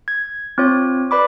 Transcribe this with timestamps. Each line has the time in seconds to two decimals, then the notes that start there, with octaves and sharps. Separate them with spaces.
0.08 G#6
0.58 C4 F4 C#5
1.11 B4 D5 B5 D6